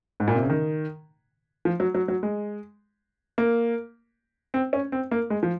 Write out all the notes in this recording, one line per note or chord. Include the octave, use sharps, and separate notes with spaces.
G#2
A#2
C3
C#3
D#3
F3
F#3
F#3
F#3
G#3
A#3
C4
C#4
C4
A#3
G#3
F3